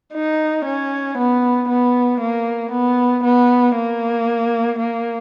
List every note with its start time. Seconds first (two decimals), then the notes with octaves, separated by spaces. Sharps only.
0.14 D#4
0.66 C#4
1.18 B3
1.69 B3
2.20 A#3
2.72 B3
3.24 B3
3.76 A#3
4.79 A#3